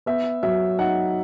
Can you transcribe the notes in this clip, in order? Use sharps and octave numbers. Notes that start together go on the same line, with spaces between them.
B3 E5
F#3 E5
D#4 F#5